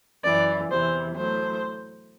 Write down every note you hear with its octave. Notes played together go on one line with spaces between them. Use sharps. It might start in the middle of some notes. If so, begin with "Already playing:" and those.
F#2 E3 D5
E2 C3 E3 C5
A2 F#3 C5